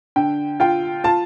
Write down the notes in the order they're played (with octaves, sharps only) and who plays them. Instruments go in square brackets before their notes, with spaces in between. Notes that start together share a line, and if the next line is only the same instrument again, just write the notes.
[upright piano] D3 G5
F4 G5
F4 A5